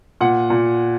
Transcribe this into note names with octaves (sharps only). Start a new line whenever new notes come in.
A#2 F#5
A#2